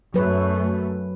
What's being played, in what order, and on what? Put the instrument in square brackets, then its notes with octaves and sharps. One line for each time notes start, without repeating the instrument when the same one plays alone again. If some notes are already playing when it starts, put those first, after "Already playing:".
[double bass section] F#2 A3 [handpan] F#3 B4